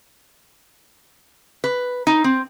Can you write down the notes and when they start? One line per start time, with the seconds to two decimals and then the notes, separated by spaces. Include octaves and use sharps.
1.64 B4
2.07 D#4
2.24 C4